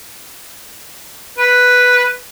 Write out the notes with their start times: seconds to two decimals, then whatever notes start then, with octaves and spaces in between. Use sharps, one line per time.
1.38 B4